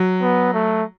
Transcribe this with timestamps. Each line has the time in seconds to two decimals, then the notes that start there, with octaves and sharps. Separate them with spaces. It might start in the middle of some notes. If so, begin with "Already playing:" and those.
Already playing: F#3
0.22 B3
0.54 A3